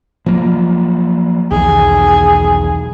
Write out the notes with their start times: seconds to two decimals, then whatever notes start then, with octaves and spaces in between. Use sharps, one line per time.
0.26 F3 F#3 A#3
1.51 B1 E2 D#3 G#4